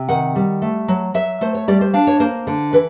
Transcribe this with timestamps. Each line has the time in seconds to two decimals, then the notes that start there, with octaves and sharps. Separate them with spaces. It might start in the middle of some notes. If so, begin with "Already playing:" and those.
Already playing: C3
0.08 D#3 F#5
0.36 G3
0.62 A3
0.88 F#3
1.14 F#3 E5
1.41 A3 C5
1.55 C#5
1.68 G3 D5
1.81 C5
1.94 D4 F5
2.07 C#5
2.20 A#3 C5
2.47 D3
2.73 E3 B4